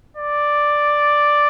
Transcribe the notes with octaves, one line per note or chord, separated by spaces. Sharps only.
D5